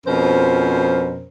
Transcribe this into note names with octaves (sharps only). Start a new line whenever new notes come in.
F2 B2 F3 C#4 A#4 C5